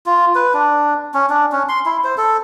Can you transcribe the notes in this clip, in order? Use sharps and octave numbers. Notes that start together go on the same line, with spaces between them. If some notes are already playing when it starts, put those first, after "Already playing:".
F4
B4
D4
C#4
D4
C#4
C6
E4
C5
A4